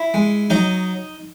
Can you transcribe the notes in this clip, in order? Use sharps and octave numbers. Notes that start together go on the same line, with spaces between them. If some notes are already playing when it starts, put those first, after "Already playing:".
Already playing: E4 E5
G#3
F#3 D#4 D#5